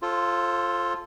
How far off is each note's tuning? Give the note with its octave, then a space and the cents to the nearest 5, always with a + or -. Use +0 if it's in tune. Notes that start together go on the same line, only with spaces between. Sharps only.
F4 +0 A4 +0 C5 +30